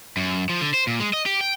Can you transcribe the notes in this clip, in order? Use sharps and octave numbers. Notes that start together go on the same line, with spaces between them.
F#2
F3
D3
C5
A#2
G#3
D#5
G4
G5